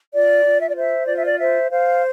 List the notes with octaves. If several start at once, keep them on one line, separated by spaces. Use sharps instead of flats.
F4 D5
F4
E5
D5
C5 E5
F4 D5
E5
D5
C5 E5
C5 F5